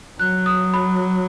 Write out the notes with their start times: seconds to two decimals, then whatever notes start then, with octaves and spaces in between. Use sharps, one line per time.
0.20 F#3 F#6
0.46 D#6
0.74 B5